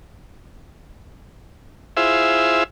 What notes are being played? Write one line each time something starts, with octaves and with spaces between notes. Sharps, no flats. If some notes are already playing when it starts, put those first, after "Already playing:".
E4 F4 G#4 C5 E5